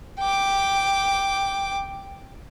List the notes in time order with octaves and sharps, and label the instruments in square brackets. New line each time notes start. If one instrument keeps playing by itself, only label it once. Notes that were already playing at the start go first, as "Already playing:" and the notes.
[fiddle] G5 D6